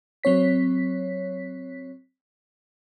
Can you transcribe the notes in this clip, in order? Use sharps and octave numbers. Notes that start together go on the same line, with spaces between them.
F#3 C4 C#5 B6